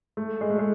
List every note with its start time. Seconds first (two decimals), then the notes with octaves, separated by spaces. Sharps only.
0.17 A3
0.41 G#3
0.50 A3
0.59 G#3